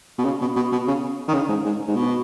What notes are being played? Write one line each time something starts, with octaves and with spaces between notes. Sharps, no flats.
B2
C#3
B2
B2
B2
C#3
D#3
C#3
G#2
G#2
G#2
B2